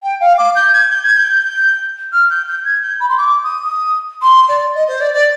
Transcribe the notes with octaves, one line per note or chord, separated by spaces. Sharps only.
G5
F5
D6
G6
G#6
G6
G#6
G6
F6
G6
G6
G#6
G6
B5
C6
D6
D#6
C6
D5
D#5
C5
D5
D5